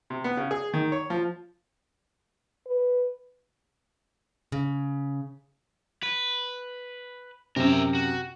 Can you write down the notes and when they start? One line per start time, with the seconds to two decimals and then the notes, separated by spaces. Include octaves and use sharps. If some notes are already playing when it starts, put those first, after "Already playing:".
0.10 C3
0.24 B3
0.37 C#3
0.51 G#4
0.73 D#3
0.92 C#5
1.10 F3
2.66 B4
4.52 C#3
6.03 B4
7.56 F#2 C3 A#4 E5
7.95 F#4